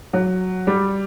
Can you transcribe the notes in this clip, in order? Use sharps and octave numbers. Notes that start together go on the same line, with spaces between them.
F#3
G3